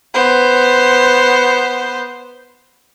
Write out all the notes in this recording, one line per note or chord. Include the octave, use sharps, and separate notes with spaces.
B3 C5